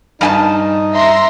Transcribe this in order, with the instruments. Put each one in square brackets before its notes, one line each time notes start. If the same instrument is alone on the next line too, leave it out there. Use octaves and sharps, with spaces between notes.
[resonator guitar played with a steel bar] G2 G#5 A5 [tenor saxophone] D#4
[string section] E5 A#5 C6